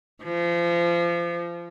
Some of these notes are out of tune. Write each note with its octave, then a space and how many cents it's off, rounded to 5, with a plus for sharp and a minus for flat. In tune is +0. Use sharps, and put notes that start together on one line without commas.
F3 -30